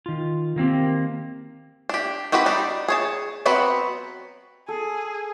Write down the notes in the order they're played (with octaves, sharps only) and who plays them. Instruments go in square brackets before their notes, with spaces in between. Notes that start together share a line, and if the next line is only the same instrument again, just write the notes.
[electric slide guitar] D#3 F4
D#3 A#3 C4 G4
[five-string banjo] D4 G4
C4 F#4 G4 B4 F#5
G3 D4 D#4
G#4 C#5 A5
F#3 B3 C4 F#4 B4
[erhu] G#4 [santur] A4